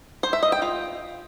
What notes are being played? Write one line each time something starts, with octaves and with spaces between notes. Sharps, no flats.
C5
E5
D#5
G5
F4